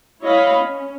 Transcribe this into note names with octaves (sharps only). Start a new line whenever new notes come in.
E4 C#5 D#5 F5 B5
C#4